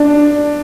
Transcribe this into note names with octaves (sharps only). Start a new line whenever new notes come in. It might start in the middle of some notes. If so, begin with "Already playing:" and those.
Already playing: D4